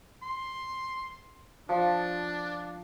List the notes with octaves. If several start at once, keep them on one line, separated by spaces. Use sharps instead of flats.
C6
F3 D4